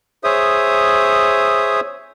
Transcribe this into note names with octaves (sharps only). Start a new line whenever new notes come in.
G#4 C5 C#5 E5 D#6